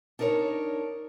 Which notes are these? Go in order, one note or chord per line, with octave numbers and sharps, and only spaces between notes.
D4 D#4 A#4 B4 C#5